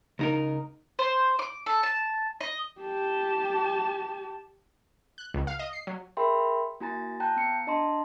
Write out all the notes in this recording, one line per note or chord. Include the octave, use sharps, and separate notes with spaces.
C#2 D#4 A#4
C5
D6
A4
A5
D#5
G4 A5
F#6
C#2
F5
D#5
C7
F#3
G#4 A#4 E5 G5 B5 C6
A#3 E4 F#4 G#5 A#5 A6
G5 A5 A#5 F#6 G6
B3 C#7
D4 D#5 A5 A#5 C6